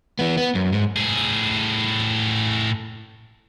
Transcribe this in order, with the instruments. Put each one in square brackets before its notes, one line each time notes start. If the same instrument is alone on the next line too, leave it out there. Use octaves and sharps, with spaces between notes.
[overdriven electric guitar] E3 B3
B3
F#2
G#2
[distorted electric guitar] A2 G#4